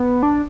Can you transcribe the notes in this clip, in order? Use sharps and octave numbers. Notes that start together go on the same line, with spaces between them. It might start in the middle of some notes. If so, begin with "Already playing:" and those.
Already playing: B3
D4